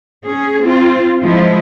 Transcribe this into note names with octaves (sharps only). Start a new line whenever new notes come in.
C#4 G#4
C4 F4
F3 G#3 E4